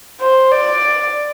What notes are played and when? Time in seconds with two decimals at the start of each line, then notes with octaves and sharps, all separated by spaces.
0.20 C5
0.51 D5